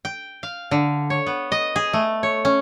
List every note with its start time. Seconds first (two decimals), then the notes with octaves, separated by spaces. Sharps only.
0.05 G5
0.43 F5
0.71 D3
1.10 C#5
1.27 B3
1.52 D#5
1.76 G#4
1.93 A3
2.23 C#5
2.45 C#4